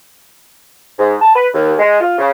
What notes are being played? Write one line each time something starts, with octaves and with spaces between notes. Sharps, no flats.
G#2
A5
B4
D#2
G#3
F4
C#3